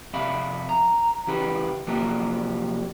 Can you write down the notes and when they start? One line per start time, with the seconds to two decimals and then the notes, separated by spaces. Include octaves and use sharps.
0.14 F2 C3 E5 F5 B5
0.69 A#5
1.27 C#3 E3 G4 B4
1.87 C3 F3 F#3 A#3 G4 A#4